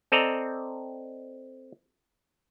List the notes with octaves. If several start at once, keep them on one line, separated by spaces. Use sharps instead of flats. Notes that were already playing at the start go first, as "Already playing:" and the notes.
C4 A4 D5 D#5 A#5